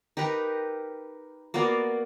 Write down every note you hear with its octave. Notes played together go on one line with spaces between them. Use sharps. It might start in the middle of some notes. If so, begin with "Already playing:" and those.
D#4 G4 A#4 B4
A#3 B3 F#4 D5